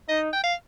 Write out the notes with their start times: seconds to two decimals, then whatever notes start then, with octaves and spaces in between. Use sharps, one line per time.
0.09 D#4 D#5
0.33 G5
0.43 F5